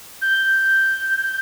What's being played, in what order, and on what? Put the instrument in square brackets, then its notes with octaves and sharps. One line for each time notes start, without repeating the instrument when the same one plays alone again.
[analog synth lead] G6